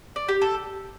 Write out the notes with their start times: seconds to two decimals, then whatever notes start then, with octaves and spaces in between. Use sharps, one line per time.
0.16 D5
0.28 G4
0.42 A4